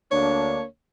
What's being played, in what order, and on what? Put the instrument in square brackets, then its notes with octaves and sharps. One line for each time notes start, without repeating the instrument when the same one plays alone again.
[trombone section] D2 A#3 D4 [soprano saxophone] C#5